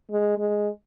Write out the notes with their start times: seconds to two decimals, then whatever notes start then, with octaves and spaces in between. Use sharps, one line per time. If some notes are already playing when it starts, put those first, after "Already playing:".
0.11 G#3
0.38 G#3